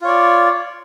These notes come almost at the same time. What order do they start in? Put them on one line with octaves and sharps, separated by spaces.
F4 C#5 D5